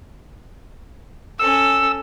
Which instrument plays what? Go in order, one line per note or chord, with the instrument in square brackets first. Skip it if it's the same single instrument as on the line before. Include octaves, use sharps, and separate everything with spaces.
[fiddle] C#4 A4 [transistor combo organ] E6